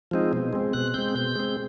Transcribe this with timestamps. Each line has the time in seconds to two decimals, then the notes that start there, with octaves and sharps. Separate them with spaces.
0.11 F3 G#3 C4 D#4
0.33 B2
0.53 G#3 C4
0.73 B2 F#6
0.94 G#3 C4 G6
1.15 B2 G6
1.36 G#3 C4